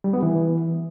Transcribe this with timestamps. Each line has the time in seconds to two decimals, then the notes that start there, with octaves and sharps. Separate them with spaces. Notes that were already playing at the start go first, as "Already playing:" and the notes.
0.04 G3
0.13 B3
0.23 E3